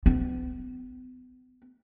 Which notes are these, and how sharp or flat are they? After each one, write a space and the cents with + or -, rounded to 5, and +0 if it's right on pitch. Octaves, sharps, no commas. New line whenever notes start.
B3 +40